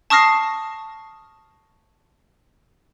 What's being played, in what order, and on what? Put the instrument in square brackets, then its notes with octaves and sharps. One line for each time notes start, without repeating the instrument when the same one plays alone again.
[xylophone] A5 C#6 D#6 F6 A#6 C7